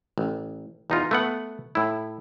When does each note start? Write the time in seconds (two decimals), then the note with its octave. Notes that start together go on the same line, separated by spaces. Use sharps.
0.18 A1
0.90 E2 D#4 F4
1.11 A3 B3 F#5
1.75 A2 E4